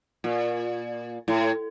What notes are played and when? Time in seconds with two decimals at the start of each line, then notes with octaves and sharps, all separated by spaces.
0.24 A#2
1.28 A2